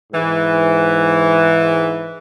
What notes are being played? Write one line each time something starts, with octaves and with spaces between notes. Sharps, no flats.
G#2 E3